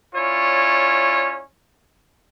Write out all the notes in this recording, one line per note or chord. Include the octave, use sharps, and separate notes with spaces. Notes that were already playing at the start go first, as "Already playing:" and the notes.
C#4 E4 F4 C#5 D5